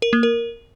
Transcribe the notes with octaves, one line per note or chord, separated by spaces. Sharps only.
A#4
A#3
A#4